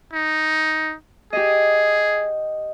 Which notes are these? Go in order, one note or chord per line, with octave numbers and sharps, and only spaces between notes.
D#4
G4 G#4 D#5